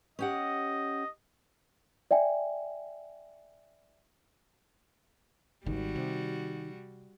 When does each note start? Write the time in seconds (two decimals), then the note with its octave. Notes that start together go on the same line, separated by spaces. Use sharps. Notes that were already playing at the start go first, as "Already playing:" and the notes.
0.19 C#4 G4 D#5 F#5
2.11 D5 E5 G5 G#5
5.66 G#1 D#3 G3 F#4
5.96 C3